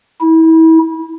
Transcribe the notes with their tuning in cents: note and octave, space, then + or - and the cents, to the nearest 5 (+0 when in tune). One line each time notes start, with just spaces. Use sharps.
E4 -30